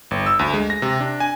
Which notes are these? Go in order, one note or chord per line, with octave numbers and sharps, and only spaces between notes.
G1
E6
D2
G#3
A#6
C3
D4
G#5